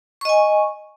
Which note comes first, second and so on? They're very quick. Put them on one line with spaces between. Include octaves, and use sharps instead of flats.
C#6 D#5 G#5